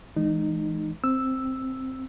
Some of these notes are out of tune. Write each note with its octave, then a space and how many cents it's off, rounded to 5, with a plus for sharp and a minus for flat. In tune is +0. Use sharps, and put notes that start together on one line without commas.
E3 +0 G#3 +25 D#4 -20
C4 +0 E6 +0